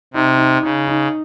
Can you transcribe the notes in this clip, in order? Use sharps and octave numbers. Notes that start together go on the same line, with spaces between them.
C3 D#4
D#4
C#3 D#4
D#4